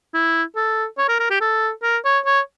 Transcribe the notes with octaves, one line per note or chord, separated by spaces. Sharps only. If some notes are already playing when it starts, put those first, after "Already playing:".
E4
A4
C#5
A#4
A#4
G4
A4
A#4
C#5
C#5